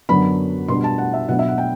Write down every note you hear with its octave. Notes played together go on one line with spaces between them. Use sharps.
F#2 D3 F#3 B3 D4 B5
B2 G3 B3 D4 C6
A5
F#5
E5
B2 F#3 B3 D4 F#5
E5
F#5
G5